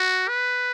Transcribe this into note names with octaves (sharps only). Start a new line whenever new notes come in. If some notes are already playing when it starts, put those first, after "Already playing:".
Already playing: F#4
B4